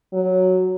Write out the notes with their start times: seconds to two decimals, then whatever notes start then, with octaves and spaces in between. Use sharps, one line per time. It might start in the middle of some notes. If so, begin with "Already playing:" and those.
0.13 F#3